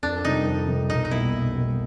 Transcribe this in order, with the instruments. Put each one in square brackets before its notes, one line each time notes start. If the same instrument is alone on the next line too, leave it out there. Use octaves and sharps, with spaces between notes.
[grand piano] F2 [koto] D4
[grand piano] C3 D#3 G3 [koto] D#4
[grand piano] F2
C3 D#3 G3
[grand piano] B1 [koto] D#4
[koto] D#4
[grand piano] B2 G3 A#3 [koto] E4
[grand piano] B1
B2 G3 A#3